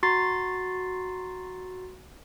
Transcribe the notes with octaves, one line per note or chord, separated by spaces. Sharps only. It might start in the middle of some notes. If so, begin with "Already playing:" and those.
F#4 A#5 C6 A6 C7